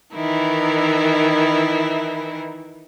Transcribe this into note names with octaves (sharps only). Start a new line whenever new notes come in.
D#3 E3 E4 A#4